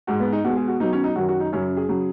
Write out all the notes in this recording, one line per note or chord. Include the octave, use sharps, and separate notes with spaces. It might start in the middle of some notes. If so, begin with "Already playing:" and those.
G#2 G#3 F#4
B3
D#4
B2 G#3 F#4
G#4
F#4
B2 F#3 D#4
C#4
D#4
F#2 D#3 F#3 F#4
F#4
D#4
F#2 C#3 F#3 C#4
G#4
C#3 F#3